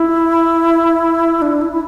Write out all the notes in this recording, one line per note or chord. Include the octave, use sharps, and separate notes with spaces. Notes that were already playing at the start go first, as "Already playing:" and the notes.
Already playing: E4
D4
E4
E4